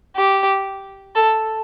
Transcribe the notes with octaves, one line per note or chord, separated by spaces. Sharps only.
G4
A4